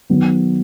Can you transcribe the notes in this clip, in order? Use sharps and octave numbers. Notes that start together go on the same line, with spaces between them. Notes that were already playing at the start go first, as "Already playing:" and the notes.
D#3 F#3 B3